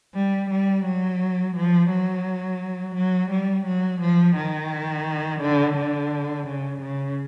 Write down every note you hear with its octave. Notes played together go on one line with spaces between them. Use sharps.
G3
G3
F#3
F3
F#3
F#3
G3
F#3
F3
D#3
D3
D3
C#3
C#3